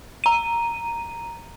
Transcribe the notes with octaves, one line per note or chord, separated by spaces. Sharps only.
A#5 D#7